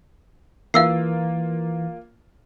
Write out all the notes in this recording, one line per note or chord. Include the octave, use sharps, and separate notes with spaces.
E3 A#3 F4 F5 E6 C7